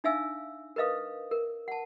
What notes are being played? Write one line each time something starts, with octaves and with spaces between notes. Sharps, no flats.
D4 D#4 E5 F5 G#5 E6
A#4 B4 D#5 F5 D#6
A#4
F#5 A5